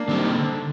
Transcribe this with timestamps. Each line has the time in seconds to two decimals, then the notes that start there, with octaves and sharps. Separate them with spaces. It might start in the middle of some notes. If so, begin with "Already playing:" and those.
Already playing: A#3 D4
0.08 D#3 G3 C4
0.35 D3